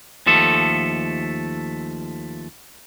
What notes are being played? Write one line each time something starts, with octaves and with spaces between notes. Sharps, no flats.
D#2 F3 A3 A4